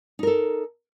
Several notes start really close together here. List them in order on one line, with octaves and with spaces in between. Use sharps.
D#4 A#4 A4